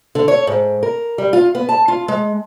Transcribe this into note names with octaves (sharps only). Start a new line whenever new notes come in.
D3
C#5
G#2
A#4
G3
F4
B3
A5
F4
G#3